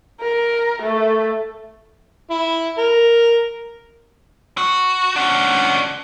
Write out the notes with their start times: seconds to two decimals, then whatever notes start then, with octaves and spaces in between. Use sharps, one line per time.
0.21 A#4
0.82 A3
2.30 E4
2.78 A#4
4.58 F#4
5.16 C#4 D4 F#5